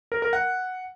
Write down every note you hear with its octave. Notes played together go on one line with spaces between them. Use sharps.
A#4
A#4
F#5